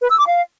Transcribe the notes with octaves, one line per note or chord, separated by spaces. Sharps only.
B4
E6
D6
F5